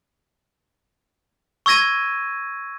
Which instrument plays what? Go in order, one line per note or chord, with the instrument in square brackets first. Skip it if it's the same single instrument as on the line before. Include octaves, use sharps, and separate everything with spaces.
[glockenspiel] C#6 E6 G#6 A#6 D#7